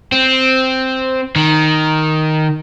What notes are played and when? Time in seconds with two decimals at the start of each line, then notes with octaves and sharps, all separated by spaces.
0.12 C4
1.36 D#3